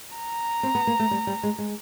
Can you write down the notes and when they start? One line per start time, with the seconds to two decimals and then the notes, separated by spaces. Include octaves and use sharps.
0.16 A#5
0.63 C4
0.75 B3
0.87 A#3
0.99 A3
1.11 G3
1.27 G3
1.43 G#3
1.58 G#3